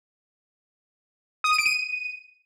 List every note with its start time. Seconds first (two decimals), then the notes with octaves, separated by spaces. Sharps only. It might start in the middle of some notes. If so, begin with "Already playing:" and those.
1.44 D#6
1.51 D#7
1.58 D7
1.66 D#7